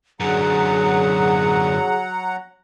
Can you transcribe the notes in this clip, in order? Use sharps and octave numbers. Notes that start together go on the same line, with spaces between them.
F#2 D3 F#3 G#4 F#5 A#5